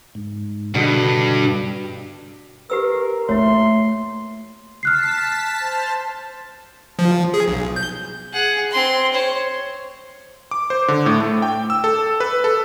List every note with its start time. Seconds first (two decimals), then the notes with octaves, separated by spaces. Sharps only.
0.15 G#2
0.75 G2 B2 D3 D4
2.70 G4 A#4 B4 E6
3.29 A3 A#3 E4 C#5 E5 C6
4.83 A5 F6 F#6 B6 C7
5.60 C5 A5 F6
6.99 F3
7.34 G#4
7.48 B1
7.76 G6
8.33 G#4 F#5
8.70 C4 C6
9.14 C5 C#5
10.51 D6
10.70 C5
10.88 D3
11.06 A2
11.20 A3
11.42 G5
11.70 E6
11.84 A4
12.20 B4
12.44 A4